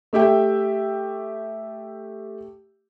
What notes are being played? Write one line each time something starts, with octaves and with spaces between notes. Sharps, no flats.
A3 G4 E5 G5